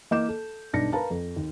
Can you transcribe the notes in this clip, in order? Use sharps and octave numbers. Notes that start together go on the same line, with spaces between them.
E3 A#3 D#5 D6 G6 E7
A4
B1 G2 D4 D#4 A#6 C#7
A#4 B4 F5 A5 A#5
F2
D#2